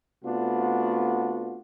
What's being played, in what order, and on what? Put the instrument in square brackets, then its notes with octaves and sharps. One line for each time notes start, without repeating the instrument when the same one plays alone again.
[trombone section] C3 A3 B3 D4 F4 F#4